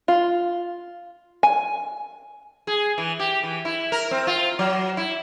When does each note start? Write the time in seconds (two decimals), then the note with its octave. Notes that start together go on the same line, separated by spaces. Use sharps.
0.08 F4
1.43 G#5
2.67 G#4
2.98 E3
3.19 G4
3.43 E3
3.65 E4
3.92 A#4
4.11 C4
4.27 F4
4.59 F#3
4.97 E4